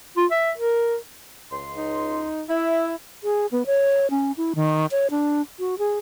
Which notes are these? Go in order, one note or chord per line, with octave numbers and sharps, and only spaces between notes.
F4
E5
A#4
C#2 C6
D#4
E4 E5
G#4
B3
C#5
C#4
E4
D#3
C#5
D4
F#4
G#4